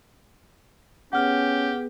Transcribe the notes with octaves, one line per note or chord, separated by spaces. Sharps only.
B3 C#4 G4 G#4 B4 F#5 F6